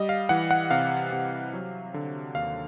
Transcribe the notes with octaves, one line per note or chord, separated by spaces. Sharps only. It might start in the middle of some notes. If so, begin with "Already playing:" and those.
Already playing: G3 D#5
F5
E3 F#5
F#5
C3 F5
C3
F#3
D3
D#2 F5